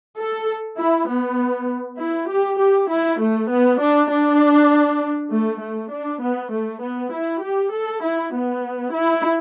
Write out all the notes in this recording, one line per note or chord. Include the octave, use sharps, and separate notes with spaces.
A4
E4
B3
E4
G4
G4
E4
A3
B3
D4
D4
A3
A3
D4
B3
A3
B3
E4
G4
A4
E4
B3
E4